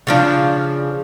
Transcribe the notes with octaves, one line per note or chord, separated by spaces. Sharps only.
C#3 F3 D4